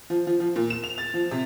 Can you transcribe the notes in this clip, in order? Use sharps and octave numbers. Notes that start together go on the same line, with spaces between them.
F3
F3
F3
A#2
E7
F7
A6
F3
C3